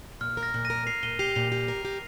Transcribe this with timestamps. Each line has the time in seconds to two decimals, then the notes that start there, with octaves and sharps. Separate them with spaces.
0.21 A#2 F6
0.37 A#4
0.43 F6 A#6
0.54 A#2
0.65 A#6 D#7
0.70 A#4
0.86 A#4 C7 F7
1.03 A#2 D#7 G7
1.19 G4 C7 F7
1.35 A#2 C7 F7
1.52 G4
1.68 A#4
1.85 G4